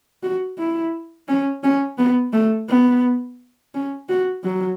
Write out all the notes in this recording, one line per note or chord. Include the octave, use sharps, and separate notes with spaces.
F#4
E4
C#4
C#4
B3
A3
B3
C#4
F#4
F#3